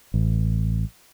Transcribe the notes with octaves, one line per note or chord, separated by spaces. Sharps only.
A1